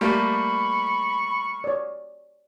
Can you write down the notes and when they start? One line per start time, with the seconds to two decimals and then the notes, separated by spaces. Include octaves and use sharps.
0.01 G3 A3 A#3 B5 C#6
1.64 C#5 D5